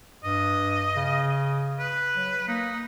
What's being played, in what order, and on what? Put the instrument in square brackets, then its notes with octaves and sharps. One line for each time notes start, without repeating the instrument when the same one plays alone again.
[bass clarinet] G2 [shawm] D#5
[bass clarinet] C#3
[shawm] B4
[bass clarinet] F#3
[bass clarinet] A#3 [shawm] D#4